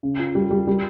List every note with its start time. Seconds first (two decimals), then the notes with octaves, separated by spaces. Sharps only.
0.03 C#3
0.19 F4
0.35 G3
0.51 G3
0.67 G3